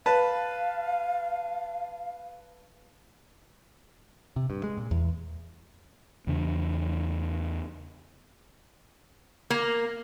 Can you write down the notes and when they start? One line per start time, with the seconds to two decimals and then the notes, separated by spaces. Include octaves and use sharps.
0.06 B4 F5 A5
4.36 C3
4.50 G2
4.64 G#3
4.78 A#2
4.91 E2
6.27 E2 C#3 D4
9.50 A#3